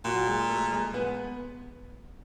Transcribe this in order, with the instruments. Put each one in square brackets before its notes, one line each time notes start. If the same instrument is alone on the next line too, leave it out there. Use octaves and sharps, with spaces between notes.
[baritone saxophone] A#2 [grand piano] F#3 F#4
[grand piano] G#3 G#4
A3 A4
G#3 G#4
B3 B4